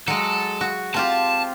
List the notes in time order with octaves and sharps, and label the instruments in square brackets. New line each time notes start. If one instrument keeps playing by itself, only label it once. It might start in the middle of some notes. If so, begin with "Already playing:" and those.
[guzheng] F#3 G#3 [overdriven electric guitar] A4
[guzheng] F#4
[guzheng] C4 F4 G4 [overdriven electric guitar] A5